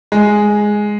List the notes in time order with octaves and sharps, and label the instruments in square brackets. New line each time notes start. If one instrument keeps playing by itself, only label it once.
[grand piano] G#3